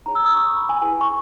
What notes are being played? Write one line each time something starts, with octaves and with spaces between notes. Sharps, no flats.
D#4 G#4 C#5 A#5
E6
D#6
C#6
C#6
B5
G#5
E4 G#4 B4 G#5
C#6